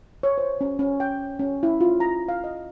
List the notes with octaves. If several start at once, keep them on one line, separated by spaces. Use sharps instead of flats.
C#5
C5
C#4
C#4
G5
C#4
E4
F4
A#5
F5
D#5